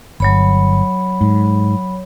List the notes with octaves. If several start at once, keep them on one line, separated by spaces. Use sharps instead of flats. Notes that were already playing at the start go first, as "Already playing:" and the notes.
G1 F#3 C#5 B5
G#2